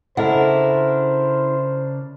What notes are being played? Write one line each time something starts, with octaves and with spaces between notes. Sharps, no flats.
C#3 D4 E4 A4 A#4 C5 D#5 F#5